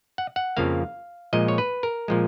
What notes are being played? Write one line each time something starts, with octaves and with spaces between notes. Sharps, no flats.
F#5
F#5
F2 C#3 F3 A#3 F5
A#2 F3 G#3 D#5
C#5
B4
A#4
A#2 F3 G#3